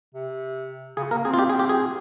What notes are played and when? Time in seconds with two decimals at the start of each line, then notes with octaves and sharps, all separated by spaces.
0.15 C3
0.97 C#3 G#4
1.11 A#3 A#4
1.25 C4 G#4
1.34 F4
1.39 G4
1.50 G#4
1.59 G4
1.69 G#4